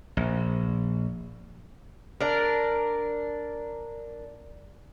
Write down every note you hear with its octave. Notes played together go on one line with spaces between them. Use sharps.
A#1
D4 A#4